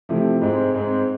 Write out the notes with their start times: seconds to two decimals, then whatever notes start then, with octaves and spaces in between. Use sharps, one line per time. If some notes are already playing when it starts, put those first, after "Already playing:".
0.09 C3 F3 A3 E4
0.41 G#2 G#3 C4
0.74 G#2 G#3 C4